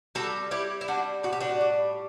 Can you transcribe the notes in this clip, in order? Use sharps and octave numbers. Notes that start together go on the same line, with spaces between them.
G3 F#4 A4
G3 E4 G4
E4
G3 D4 F#4
A2 F#4
G4
D4 F#4
G3